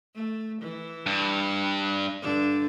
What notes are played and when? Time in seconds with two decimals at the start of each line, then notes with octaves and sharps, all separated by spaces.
0.15 A3
0.62 E3
1.06 G2
2.22 G2 D3 D4